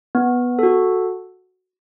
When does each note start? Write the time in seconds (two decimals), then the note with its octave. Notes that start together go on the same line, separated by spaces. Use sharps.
0.15 B3
0.59 F#4 A4